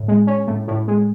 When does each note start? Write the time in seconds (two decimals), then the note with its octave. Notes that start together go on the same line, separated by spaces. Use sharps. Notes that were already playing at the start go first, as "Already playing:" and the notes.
Already playing: A2
0.08 G#3
0.27 C#4
0.47 A2
0.68 A2
0.88 G#3